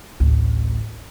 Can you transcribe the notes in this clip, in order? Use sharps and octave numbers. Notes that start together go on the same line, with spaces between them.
A1 D2